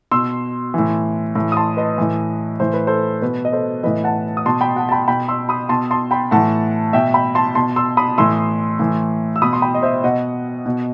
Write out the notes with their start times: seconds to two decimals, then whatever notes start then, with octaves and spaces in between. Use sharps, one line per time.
0.12 B2 C6 E6
0.74 A2 E3
1.35 A2 E3
1.52 D#6
1.57 A5 C6
1.77 B4 D#5
1.98 A2 E3
2.60 A2 E3 C5
2.74 B4
2.87 A4 C5
3.22 B2 B4
3.45 D#5
3.52 A4 C5
3.83 A2 E3 B4 D#5
4.04 F#5 A5
4.37 D#6
4.46 B2 A5 C6
4.61 G5 B5
4.76 F#5 A5
4.89 A5
4.92 G5 B5
5.08 B2 G5 B5
5.28 C6 E6
5.49 B5 D#6
5.69 B2 A5 C6
5.91 A5 C6
6.11 G5 B5
6.31 A2 E3 F#5 A5
6.93 B2 E5 G5
7.14 G5 B5
7.35 A5 C6
7.55 B2 A5 C6
7.76 C6 E6
7.97 B5 D#6
8.18 A2 E3 C6 E6
8.80 A2 E3
9.36 E6
9.42 B2 B5 D#6
9.53 C6
9.62 G5 B5
9.75 D#5
9.82 C5 E5
10.04 B2 D#5 F#5
10.66 B2